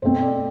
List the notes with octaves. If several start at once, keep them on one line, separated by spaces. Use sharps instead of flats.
B2 A3 C4 C5
D5